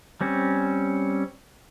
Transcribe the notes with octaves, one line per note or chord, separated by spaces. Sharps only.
G3 C4 C#4